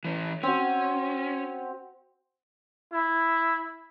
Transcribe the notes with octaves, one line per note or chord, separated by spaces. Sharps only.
E3 C#4
C4 C#4 F#4
E4